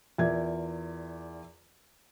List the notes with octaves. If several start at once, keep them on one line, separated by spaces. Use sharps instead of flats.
E2 F4 A#4 D5 E5 G#6